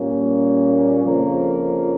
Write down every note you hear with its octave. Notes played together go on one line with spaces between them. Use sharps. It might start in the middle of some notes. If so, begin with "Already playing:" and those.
Already playing: A#2 G3 A#3 C#4
F2 C#3 F3 A#3 C#4